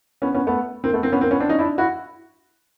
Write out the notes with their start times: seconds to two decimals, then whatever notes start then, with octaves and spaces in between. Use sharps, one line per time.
0.22 B3 C#4
0.34 B3 C#4
0.47 A3 B3
0.84 A#3 C4
0.93 A3 B3
1.02 A#3 C4
1.12 B3 C#4
1.21 A#3 C4
1.31 B3 C#4
1.40 C4 D4
1.49 C#4 D#4
1.59 D4 E4
1.78 E4 F#4